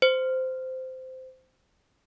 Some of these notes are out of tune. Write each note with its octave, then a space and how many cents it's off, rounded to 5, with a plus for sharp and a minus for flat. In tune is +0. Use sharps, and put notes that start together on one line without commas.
C5 -15